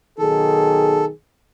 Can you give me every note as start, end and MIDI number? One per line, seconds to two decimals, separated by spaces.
0.18 1.09 35
0.18 1.09 51
0.18 1.09 68
0.18 1.05 69